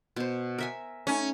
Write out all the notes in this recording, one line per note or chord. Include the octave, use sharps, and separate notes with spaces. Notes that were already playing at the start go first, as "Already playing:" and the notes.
B2 C5
A#4 E5 G#5
A3 C#4 D#4